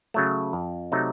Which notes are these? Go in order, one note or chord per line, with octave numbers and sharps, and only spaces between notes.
C#3 F#3 A3
F2
C3 F#3 A3 D#4